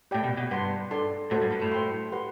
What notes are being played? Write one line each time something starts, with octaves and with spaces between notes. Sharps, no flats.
A2 G4 D5 G5
B2
B2
G2 B4 F#5 C6
D4 A4 D5 A5 C6
A2 F#4 A4 C5 F#5 A5
G2
G2
A2
C5 G5 C6
G4 B4 F#5 C6